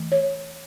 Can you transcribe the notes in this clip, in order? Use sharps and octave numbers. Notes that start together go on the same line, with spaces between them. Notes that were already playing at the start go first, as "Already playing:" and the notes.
Already playing: E3 A3
C#5